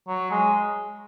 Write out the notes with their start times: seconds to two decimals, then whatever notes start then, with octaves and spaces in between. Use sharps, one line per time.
0.08 F#3
0.31 G#3